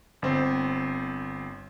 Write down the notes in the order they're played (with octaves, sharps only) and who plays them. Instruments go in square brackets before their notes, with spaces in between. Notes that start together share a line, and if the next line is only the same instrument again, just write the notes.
[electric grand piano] G1 C4 C5